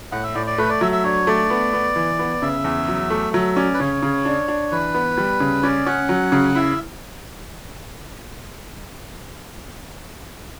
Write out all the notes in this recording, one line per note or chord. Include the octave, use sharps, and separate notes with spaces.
A2 F#5
E5
A2 D5
D5
A3 B4
D5
F#3 E5
E5
D4 C#5
A3 D5
B3
B3
E3
B3
C#3 E5
E2
F#3
A3
F#3 E5
C#4 D5
B4
C#3 C#5
C#3
D4
D4
E3 B4
B3
G3
C#3
C#4 D5
C#4 F#5
F#3
C#3
E4 E5